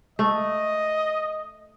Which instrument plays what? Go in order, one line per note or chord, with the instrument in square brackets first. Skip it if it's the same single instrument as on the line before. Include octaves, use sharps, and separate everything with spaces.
[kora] A3 [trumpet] D#5